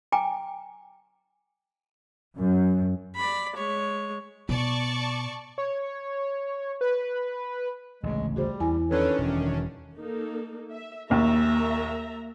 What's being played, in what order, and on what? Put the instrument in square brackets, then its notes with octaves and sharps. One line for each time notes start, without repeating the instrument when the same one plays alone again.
[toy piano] G5 G#5 A#5 D6
[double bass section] F#2
[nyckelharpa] D5 B5
G#3 C#5
[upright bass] B2 [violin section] D5 A5 C#6
[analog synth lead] C#5
B4
[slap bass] A1 D2 C#3 [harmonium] G#3
[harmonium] G3 [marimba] F#4 G#4 C5
[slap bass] E2 [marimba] E4 G#5
[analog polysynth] D#3 C#4 D4 [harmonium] A4 B4 C#5
[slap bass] E1 [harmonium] F#2
[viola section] A#3 D#4 A4
E5
[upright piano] A#1 D#2 [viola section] A#3 E5 A#5